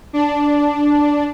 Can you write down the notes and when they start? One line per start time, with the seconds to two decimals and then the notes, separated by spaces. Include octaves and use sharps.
0.13 D4